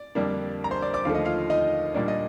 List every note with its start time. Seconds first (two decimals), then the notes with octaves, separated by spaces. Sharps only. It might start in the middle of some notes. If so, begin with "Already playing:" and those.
Already playing: D5
0.15 F2 D3 G3 A#3 D4
0.64 A#5
0.71 C5 C6
0.82 D5 D6
0.94 D5 D6
1.05 D#2 D3 F3 A3 F5
1.15 D#5
1.25 F4 F5
1.50 D#4 D#5
1.94 A#2 G3 A#3 D4 D5
2.08 D#5